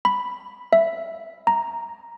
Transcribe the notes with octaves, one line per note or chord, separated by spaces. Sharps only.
B5
E5
A#5